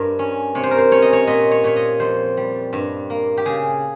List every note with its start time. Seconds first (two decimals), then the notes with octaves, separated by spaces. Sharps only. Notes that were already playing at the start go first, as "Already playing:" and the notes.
Already playing: G2 A#4 C5
0.19 C#4
0.55 C3 C#5
0.63 C5
0.71 A#4
0.78 C5
0.91 C#4 C#5
1.02 D#5
1.13 C#5
1.27 A#2 D#5
1.51 C#5
1.64 A#2 C#5
1.76 D#5
2.00 F2 C5
2.37 G3
2.73 G2
3.10 A#3
3.38 G4
3.45 C#3 G#4